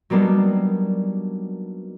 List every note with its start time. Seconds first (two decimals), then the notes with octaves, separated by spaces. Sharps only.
0.10 F#3 G3 A#3 B3 D4 D#4